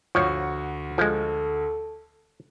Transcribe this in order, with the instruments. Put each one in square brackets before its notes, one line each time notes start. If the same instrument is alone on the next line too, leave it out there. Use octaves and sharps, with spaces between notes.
[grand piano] D2 F#4 C#6 [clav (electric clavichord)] F3 C#5
[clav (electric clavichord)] F3 G#3 [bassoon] A4